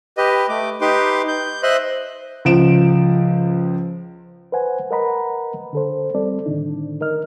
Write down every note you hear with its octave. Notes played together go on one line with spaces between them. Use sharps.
G4 B4 D#5
A3 D6
D#4 G4 B4 C6 D6
G6
C5 D#5 E5 C6 F#6
C#2 F3 D7 E7
B4 C5 F#5 G#5
A#4 B4 D#5 F#5 A#5 B5
D3 A4 C5
G3 C4 A4 D5
A2 D3 D#3 D4 D#4
A#4 D#5 F6